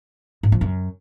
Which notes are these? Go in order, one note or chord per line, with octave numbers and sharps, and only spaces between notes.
G#2
F3
F#2